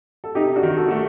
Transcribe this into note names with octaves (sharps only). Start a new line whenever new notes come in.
A4
C3 D#4 G4
D4 F#4
D#3
F#4 A4
A3 F#4